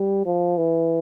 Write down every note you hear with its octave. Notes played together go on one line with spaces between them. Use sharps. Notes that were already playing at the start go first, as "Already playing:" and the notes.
Already playing: G3
F3
E3